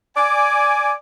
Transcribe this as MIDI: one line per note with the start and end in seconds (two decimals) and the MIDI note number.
0.17 0.93 74
0.17 0.93 80